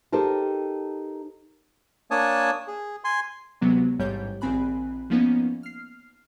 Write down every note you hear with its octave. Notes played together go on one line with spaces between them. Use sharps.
D#4 G4 A4 A#4 C5
A#3 D4 C#5 G#5 A5 D#6
G#4
G#5 C6
D2 C3 F#3 G#3 B3
A1 G#2 G3 G4 C#5 G6
A#1 D#3 C4 G#5 B5 F#6
F3 A#3 B3 C#4 D#4
F6 C7